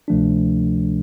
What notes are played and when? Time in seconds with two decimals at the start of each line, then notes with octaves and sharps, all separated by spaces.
0.08 D2 C3 F3 A3 D4